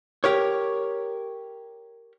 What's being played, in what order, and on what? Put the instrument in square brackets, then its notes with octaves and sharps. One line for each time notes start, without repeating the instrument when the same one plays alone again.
[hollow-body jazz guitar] G4 A#4 C#5